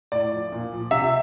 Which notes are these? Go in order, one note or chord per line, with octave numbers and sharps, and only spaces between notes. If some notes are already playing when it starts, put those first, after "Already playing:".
A2 D5
F3
A#2
F3
C3 E5